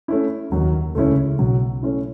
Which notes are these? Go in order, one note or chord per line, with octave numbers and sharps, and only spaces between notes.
A3 C#4 E4
D#2 D#3 F#3
C#2 C#3 A3 C#4 E4
B1 B2 F#3
A3 C#4 E4